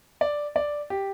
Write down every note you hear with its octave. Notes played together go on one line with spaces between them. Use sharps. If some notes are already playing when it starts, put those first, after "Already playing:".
D5
D5
G4